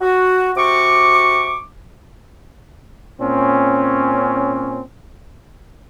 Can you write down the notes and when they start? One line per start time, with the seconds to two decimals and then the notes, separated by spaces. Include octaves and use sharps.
0.01 F#4
0.56 C3 F#4 C#6 D6
3.21 A#2 C4 C#4